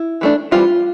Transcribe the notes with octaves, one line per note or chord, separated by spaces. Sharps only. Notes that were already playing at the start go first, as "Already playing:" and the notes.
Already playing: E4
E3 A3 D4
E3 G3 C4 F4